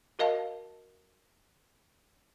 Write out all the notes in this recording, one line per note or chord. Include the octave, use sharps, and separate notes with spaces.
F#4 A#4 D#5 F5 A5